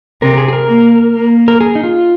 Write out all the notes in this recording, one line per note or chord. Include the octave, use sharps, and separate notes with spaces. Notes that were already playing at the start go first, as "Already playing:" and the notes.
C3 A#4
G#4
G#4
A#4
A#3
A#3
A#4
G#4
D#4
F4